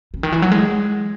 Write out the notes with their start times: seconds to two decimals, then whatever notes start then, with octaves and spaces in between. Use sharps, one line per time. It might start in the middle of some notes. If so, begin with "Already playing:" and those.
0.14 C#3
0.23 D#3
0.32 E3
0.42 F#3
0.52 G#3